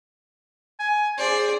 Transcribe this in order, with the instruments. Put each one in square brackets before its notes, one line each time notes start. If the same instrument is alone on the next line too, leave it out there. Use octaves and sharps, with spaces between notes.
[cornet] G#5
[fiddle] G#4 D5 [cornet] C5